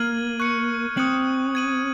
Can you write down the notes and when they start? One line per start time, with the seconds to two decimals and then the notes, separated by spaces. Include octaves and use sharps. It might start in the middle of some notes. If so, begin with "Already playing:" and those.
Already playing: A#3 F6 G#6 D#7 F#7
0.40 C#6 F#6 C#7
0.97 C4 D#6 F#6 C#7 F#7
1.55 G#6 D#7 F#7